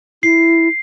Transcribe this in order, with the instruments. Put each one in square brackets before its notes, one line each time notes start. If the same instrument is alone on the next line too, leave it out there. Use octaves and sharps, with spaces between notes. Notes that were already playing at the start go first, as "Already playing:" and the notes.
[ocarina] E4 [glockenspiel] C7